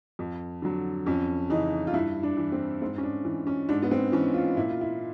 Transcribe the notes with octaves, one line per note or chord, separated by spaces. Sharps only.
F2
D3 F#3
F2 C#4
C#3 E3 D#4
F4
G2 E4
D4
E3
C4
G#2 C4
C#4
D4
E3
C#4
G#2 D4
B3
C4
E3 C#4
F4
A#2 E4
F4
E4